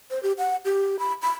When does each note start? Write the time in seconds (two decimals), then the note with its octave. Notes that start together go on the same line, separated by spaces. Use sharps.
0.11 C5
0.23 G4
0.38 F#5
0.65 G4
0.99 B5
1.22 B5